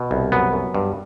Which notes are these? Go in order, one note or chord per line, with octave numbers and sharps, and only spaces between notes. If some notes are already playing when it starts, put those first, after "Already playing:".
Already playing: B2
C2
F#2 B3
F#2
G2